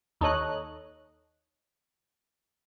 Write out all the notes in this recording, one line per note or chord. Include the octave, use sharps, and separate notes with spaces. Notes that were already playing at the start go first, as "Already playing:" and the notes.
D#2 D#4 A4 C#5 D#5 F#6